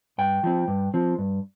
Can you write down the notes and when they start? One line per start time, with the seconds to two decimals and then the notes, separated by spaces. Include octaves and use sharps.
0.18 G2 G5
0.43 F3 C4
0.68 G2
0.94 F3 C4
1.18 G2